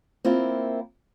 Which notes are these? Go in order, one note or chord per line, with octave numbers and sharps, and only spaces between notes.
A#3 C4 E4 F4